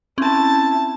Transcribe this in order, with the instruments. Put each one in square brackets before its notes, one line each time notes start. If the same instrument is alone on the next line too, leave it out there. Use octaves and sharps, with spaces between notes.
[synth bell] C4 C#4 [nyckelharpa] E4 A5